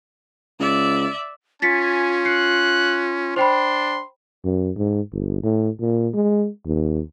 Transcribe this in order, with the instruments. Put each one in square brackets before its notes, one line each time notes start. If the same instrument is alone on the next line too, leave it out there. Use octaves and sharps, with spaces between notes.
[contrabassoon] C#2 [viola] D5 E5
[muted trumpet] C#4 [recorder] F4 [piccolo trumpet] G#5 [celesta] A6 B6 C#7
[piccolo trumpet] F#6 [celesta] C7 C#7
[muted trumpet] D4 [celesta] C5 G5 B5 [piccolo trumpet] C6
[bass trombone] F#2
G#2
G1
A2
A#2
G#3
D#2